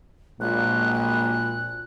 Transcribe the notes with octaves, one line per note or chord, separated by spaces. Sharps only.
A#1 A#2 F#3 G#3 A#3 F#6